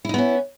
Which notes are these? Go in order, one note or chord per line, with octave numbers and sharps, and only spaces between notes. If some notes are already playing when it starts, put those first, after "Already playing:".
B3 C#4 D#4 E4